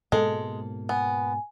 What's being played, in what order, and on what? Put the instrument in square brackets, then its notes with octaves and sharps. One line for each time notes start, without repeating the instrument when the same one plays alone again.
[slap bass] G#2 B2 A#3 [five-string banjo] G#3 [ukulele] A4
[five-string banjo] B3 [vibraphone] G#5